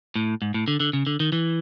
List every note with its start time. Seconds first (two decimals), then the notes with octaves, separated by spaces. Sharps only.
0.16 A2
0.42 G#2
0.54 A2
0.68 D3
0.80 D3
0.93 C#3
1.07 D3
1.20 D#3
1.32 E3